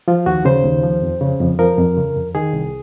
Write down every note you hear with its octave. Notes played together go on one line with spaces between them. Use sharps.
F3 F4
D#2 F#4
C#3 C5
D#2
F3
F2
C#3
F2
F3 A#4
F2
C#3
F2
D#3 G#4
C2